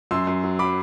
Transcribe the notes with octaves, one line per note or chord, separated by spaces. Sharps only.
F#2 C6 E6
F#2
F#3
F#3 B5 D6